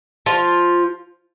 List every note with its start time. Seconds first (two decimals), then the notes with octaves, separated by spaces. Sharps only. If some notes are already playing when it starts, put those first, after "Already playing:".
0.26 F3 F4